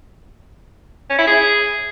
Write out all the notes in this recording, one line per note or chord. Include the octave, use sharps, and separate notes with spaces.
C#4
E4
G#4